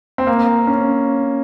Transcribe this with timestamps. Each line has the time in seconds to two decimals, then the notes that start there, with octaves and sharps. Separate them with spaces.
0.18 C4
0.27 A#3
0.67 C#4